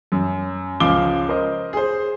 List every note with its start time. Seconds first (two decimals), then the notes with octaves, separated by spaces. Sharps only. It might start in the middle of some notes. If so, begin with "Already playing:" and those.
0.12 F#2
0.80 C#2 C#3 F3 F5 D6 G7
1.29 A#4 C5 D#5
1.73 G#4 C5